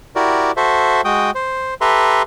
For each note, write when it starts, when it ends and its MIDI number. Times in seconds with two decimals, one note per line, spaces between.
0.16 0.52 64
0.16 0.52 66
0.16 0.52 67
0.16 0.52 70
0.16 0.52 74
0.57 1.01 66
0.57 1.01 69
0.57 1.01 72
0.57 1.01 76
1.05 1.31 56
1.05 1.31 66
1.05 1.31 79
1.05 1.31 87
1.35 1.74 72
1.81 2.22 67
1.81 2.22 69
1.81 2.22 71
1.81 2.22 76
1.81 2.22 82
1.81 2.22 84